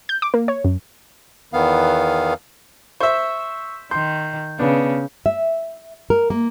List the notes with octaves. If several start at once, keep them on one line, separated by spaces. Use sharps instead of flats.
G6
D6
A#3
C#5
F#2
E2 D#3 B3 F5
C5 E5 C#6 E6
D#3 C6 G6
C#3 B3 D4
E5
A#4
A#3